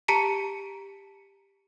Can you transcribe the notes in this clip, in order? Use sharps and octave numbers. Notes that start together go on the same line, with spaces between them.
G4 A5 A#5 B6 C#7 D7